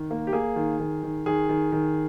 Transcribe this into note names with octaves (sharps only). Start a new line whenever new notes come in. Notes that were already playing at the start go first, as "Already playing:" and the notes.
Already playing: D#3
A#3
G4
A#3 G#4
D#3
D#3
D#3
D#3 G#4
D#3
D#3